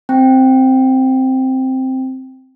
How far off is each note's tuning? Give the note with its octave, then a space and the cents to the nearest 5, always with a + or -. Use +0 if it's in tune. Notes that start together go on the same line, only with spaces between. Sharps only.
C4 +0 G5 +0